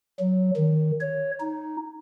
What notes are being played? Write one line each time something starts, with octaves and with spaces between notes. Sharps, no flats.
F#3
D#3
C#5
D#4